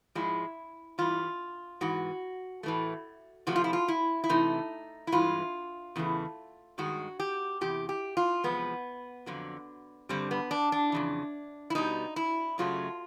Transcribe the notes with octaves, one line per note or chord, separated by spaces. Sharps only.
G#2 F3 G#3 E4
G2 E3 G3 F4
G#2 E3 F#4
A2 E3 A3
C3 F3 A3 F#4
F4
E4
F4
E4
E4
C3 E3 A3 D#4
E4
G2 E3 G#3 F4
E2 C#3 E3 A3
G2 D#3 G#3 F#4
G4
E2 C3 G4
G4
F4
E2 C3 F3 G#3 B3
F2 D3 F#3
G2 D3 G3 C4
B3
D4
D4
F2 C#3 E3
E4
B2 G3 D#4
E4
F#2 C#3 F#3 A3 F4